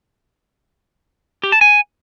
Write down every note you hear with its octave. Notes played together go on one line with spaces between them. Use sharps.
G4
A5
G#5